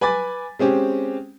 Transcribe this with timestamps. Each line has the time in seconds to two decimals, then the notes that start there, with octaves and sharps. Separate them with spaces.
0.01 B4 G#5 B5 D6 A6
0.59 G#3 C4 C#4 G4